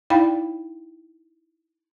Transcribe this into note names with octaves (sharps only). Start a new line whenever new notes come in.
D#4 E4 D5 F5 G5 B5